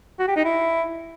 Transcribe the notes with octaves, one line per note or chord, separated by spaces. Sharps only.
F#4
G4
D#4
E4